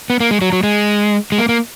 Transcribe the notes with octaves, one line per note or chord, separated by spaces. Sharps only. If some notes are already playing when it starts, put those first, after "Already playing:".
B3
A#3
G#3
F#3
F#3
G#3
G#3
A#3
A#3